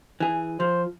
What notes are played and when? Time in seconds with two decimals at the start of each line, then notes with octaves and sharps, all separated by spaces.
0.20 E3 G#4
0.60 F3 C5